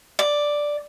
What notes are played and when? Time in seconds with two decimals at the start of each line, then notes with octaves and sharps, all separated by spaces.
0.19 D5